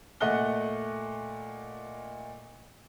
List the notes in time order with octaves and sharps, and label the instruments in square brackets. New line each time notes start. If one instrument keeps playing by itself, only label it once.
[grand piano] A#2 A3 D#5 F#5 F#6 G7